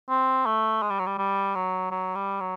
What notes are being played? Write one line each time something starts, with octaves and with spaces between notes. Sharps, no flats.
C4
A3
G#3
G3
F#3
G3
G3
F#3
F#3
G3
F#3